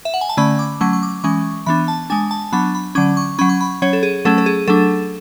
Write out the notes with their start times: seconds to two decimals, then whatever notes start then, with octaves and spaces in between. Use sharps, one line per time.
0.05 E5
0.14 F#5
0.21 G#5
0.29 A5
0.37 D3 A3 C#4 B5
0.59 D6
0.81 F#3 A3 C#4 C#6
0.93 C#6
1.03 D6
1.24 E3 G#3 C#4 C#6
1.66 E3 B3 D4 B5
1.88 A5
2.10 G#3 D4 G#5
2.31 A5
2.52 F#3 B3 D4 B5
2.75 B5
2.95 D3 F#3 C#4 D6
3.17 C#6
3.39 F#3 C#4 B5
3.49 C#6
3.61 B5
3.82 F#3 C#4 C#5
3.93 A4
4.03 G#4
4.25 F#3 A3 C#4 A4
4.38 A4
4.46 G#4
4.68 F#3 A3 D4 A4